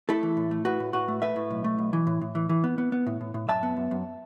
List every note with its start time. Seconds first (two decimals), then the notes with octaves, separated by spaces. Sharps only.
0.09 A3 E4 A4
0.23 E3
0.37 A2
0.51 A3
0.65 A2 F#4 B4
0.80 A2
0.93 A2 F#4 B4
1.08 A3
1.22 A3 B4 E5
1.36 A2
1.50 B1
1.64 A3
1.78 B1
1.93 E3
2.07 A2
2.21 A2
2.35 E3
2.49 E3
2.64 B3
2.78 B3
2.92 B3
3.07 A2
3.21 A2
3.34 A2
3.48 F#2 E5 A5
3.63 B3
3.77 F#2
3.91 F#2